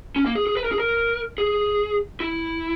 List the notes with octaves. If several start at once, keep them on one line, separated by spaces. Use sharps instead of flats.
C#4
A#3
G#4
G#4
B4
A#4
G#4
A#4
G#4
E4